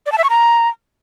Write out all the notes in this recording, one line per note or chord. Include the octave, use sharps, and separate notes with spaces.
D5
A5
E5
C#6
A#5